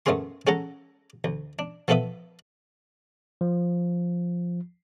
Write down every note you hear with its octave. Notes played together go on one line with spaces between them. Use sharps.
F#2 A3 B3 C#4 G#4 C6
C#4 G#4 A4 F#5 A#5
D2
D4
F3 B3 A4 B4 E5 D#6
F3